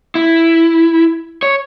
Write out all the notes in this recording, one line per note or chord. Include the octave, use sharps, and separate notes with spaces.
E4
C#5